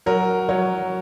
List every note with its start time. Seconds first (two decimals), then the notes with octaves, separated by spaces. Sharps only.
0.06 F#3 A#4
0.49 F#3 C#5